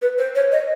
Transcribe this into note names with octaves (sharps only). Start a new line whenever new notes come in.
B4
C5
C#5
D#5